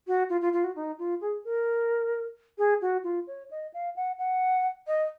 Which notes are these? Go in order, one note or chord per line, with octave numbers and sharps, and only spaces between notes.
F#4
F4
F4
F4
F#4
D#4
F4
G#4
A#4
G#4
F#4
F4
C#5
D#5
F5
F#5
F#5
D#5